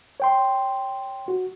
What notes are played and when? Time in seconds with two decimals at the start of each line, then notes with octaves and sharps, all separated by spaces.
0.20 C#5 G5 C6
1.28 F#4